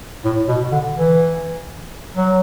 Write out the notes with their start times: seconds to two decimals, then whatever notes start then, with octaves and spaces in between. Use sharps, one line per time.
0.25 A2
0.48 B2
0.72 D3
0.96 E3
2.16 F#3